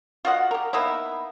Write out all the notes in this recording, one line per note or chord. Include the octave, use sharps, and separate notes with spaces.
F4 F#4 D#5 F#5
G4 A#4
A#3 B3 D#4 E4